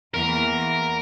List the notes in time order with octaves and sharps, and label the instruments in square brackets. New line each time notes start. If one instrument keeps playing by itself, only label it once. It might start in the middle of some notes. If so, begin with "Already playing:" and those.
[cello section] E2 E3 A#3 [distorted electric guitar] A#4